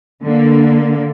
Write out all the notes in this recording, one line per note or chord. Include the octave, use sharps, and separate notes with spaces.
D3 A#3